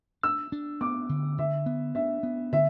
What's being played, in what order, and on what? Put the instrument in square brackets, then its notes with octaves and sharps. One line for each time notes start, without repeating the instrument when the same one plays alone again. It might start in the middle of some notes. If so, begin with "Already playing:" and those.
[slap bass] D4 [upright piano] E6
[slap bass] D4
[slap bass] B3 [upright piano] D6
[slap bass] D3
[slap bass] D3 [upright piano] E5
[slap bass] B3
[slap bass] D4 [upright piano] E5
[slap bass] B3
[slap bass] D3 [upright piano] E5